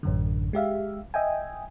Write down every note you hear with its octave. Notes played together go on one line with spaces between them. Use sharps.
A1 F#2 D3
G#3 G4 E5 F5
D#5 E5 G5 G#5